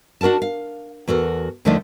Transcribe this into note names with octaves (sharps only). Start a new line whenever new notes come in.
D4 F#4 A#4 F#5 A5
F5
E2 F#4 A4 A#4
D#2 D3 F3 A3 D#4 D5